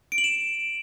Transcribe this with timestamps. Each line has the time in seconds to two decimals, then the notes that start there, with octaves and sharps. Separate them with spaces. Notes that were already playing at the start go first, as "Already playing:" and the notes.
0.12 D7
0.18 F#7
0.24 E7